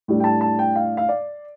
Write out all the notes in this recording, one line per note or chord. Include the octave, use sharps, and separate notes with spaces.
A2 G3 D4
G5
A5
A5
G5
F5
F5
D5